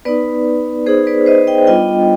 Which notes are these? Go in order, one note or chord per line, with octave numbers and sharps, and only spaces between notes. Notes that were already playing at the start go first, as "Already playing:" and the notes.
B3 D#4 B4 D5
B3 D#4 G#4 C5
B4 D5
C5 D#5
D#5 G5
G3 B3 D4 F4 D#5 G5